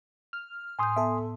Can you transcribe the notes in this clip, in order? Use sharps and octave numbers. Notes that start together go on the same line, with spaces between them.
F6
A2 G#5 C6 D#6 G6
B3 A4 E5